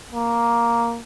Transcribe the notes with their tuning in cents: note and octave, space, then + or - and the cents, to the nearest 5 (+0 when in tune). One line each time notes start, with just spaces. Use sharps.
A#3 +5